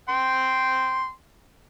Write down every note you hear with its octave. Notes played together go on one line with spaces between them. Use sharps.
G5 C6